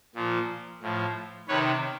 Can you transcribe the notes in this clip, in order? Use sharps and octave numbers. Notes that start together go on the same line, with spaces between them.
A#2 F3
A2 F3
C3 D#3 B4 C#5